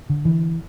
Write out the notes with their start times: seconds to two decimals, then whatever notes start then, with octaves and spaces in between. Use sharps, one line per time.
0.10 D3
0.25 E3